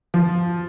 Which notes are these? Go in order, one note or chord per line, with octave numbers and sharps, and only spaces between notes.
F3